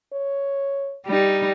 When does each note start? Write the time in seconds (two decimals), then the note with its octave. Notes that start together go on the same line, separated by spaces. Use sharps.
0.13 C#5
1.06 G3 D#4